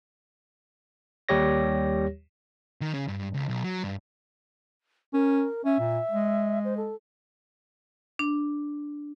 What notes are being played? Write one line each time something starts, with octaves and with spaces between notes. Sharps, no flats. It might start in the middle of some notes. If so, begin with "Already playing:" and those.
D#2 G3 G4 C#5 A#6
D#3
C#3
G2
C#2
B1
F#3
G2
C#4 A#4
C#4 E5
A#2
G#3
C5
A4
D4